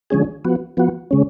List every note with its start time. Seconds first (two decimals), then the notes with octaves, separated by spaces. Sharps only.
0.10 D3 F3 G#3 C#4 G#4
0.45 F3 B3 F#4
0.77 F3 B3 F#4
1.11 C#3 G#3 C#4